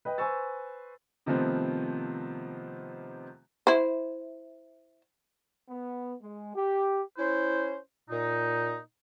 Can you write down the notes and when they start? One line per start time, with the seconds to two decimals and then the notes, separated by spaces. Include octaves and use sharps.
0.05 B4 D#5 G5
0.18 B4 C5 G#5 C#6 E6 A6
1.26 C3 D#3 F3 A3 B3 C4
3.67 E4 C5
5.69 B3
6.22 G#3
6.55 G4
7.18 C#4 E4 C5
8.09 A#2 D#4